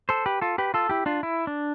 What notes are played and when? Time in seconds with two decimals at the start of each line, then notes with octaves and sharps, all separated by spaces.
0.09 A4 C5
0.26 G4 B4
0.41 F4 A4
0.58 G4 B4
0.74 F4 A4
0.89 E4 G4
1.06 D4 F4
1.23 E4
1.47 D4